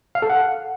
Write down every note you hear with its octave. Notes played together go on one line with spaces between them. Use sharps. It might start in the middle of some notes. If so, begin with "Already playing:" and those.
F5
A4
F#5